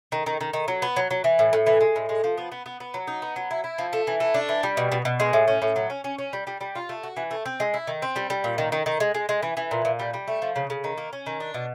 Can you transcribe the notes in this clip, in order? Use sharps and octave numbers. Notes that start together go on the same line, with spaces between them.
D#3
D#3
D#3
D#3
F#3
B3
F#3
F#3
E3
A2
A2
E3
G#3
A2
G#3
F3
B3
B3
B3
B3
F#3
D#4
B3
F#3
E4
E4
F3
A3
E3
A3
D4
E3
G3
B2
B2
B2
G#3
A2
C#4
A2
F#3
C#4
C#4
C#4
G3
G3
G3
F4
A3
F#4
E3
A3
C4
G#3
E4
D#3
C4
G3
G3
A#2
D#3
D#3
D#3
G#3
G#3
G#3
E3
E3
A#2
A#2
G3
G3
A3
F3
C#3
C#3
D#3
A#3
C#4
D#3
D4
B2